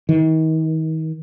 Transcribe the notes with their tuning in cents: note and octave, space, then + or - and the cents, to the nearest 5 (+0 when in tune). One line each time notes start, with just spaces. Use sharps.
D#3 +40